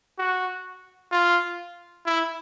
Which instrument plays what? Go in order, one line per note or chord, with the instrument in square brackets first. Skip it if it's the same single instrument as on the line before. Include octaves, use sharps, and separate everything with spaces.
[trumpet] F#4
F4
E4